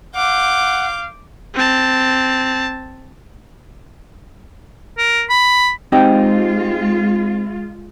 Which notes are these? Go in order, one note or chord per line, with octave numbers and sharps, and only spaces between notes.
F5 F#5 D6 G6
C4 A5
A#4
B5
G#3 C4 D#4 F4 G4